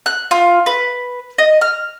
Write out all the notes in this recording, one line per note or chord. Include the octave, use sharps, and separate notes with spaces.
F#6
F4
B4
D#5
F6